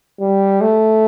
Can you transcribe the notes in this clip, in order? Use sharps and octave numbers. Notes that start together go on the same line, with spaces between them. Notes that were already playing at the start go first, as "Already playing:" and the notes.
G3
A3